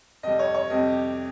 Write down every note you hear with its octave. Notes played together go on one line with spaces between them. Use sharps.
F2 C3 G3 D#5
C#5
C#5
F2 C3 G3 D#5
G4